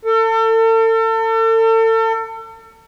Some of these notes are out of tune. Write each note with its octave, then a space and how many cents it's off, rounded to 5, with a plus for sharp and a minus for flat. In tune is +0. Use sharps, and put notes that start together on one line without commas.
A4 +35